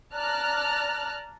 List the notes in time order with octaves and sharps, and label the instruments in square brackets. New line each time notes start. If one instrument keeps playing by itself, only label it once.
[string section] D5 A5 A#5 F6 F#6